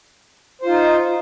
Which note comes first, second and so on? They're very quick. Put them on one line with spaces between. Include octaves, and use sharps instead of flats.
C5 F4 D#4